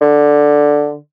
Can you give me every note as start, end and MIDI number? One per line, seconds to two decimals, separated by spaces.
0.01 0.96 50